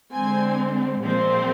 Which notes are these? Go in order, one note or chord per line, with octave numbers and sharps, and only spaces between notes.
D3 G#3 C4 G#5
A#2 F3 G#3 C4